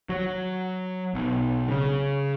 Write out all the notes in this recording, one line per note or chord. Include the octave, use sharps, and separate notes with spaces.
F#3
B1
C#3